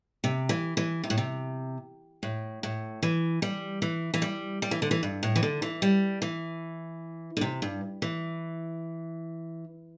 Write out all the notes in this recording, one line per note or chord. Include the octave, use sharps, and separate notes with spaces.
C3
E3
E3
C3
A2
C3
A2
A2
E3
G3
E3
E3
G3
G3
E3
D3
E3
G2
A2
E3
D3
E3
G3
E3
D3
C3
G2
E3